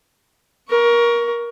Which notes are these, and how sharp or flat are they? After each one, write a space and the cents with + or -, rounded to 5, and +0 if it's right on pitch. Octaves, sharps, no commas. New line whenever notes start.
A#4 +20 C#6 +15